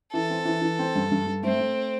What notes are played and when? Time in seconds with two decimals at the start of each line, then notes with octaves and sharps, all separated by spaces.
0.13 E3 A4
0.30 C4
0.45 E3
0.62 E3
0.79 C4
0.95 G2
1.12 G2
1.27 G2
1.43 A3 C4
1.60 A3